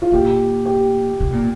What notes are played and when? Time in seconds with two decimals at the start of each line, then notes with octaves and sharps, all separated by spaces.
0.02 F4
0.12 A#2 G4
0.65 G4
1.20 C3
1.32 A#2